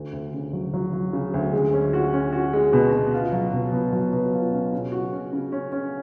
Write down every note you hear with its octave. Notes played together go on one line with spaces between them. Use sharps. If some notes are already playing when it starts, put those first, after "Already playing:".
Already playing: D2
D2
C#3
F#3
F#3
F#3
C#3
D2
G#3
C#4
F#4
C#4
F#4
G#3
B2
B2
F4
F#3
B2
B2
F#3
B2
F4
C#4
C#3
F#4
C#4
C#3
C#4
C#4